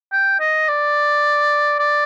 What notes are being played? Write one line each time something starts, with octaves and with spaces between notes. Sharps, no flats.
G5
D#5
D5
D5